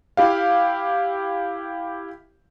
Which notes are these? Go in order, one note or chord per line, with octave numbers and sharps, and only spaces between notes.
E4 G4 F5